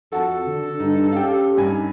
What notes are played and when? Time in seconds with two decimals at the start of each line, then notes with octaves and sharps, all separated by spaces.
0.13 F2 F#4 A4 A5
0.47 D3 D4
0.80 G2 D#4
1.12 C#4 G4 F5 G5
1.57 G2 D#4 G#5 B5